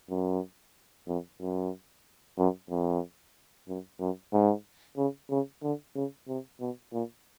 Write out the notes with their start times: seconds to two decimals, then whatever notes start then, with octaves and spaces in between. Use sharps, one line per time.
0.10 F#2
1.07 F2
1.40 F#2
2.38 F#2
2.70 F2
3.68 F#2
4.00 F#2
4.33 G#2
4.97 C#3
5.30 C#3
5.63 D3
5.95 C#3
6.28 C3
6.60 B2
6.93 A#2